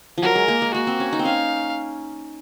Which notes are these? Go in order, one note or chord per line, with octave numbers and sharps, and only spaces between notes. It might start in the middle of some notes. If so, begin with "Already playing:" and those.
F3
F#3 A#4
G#3
A#3
G#3
A#3 F#4
C4
C#4
D#4
C4
C#4 F5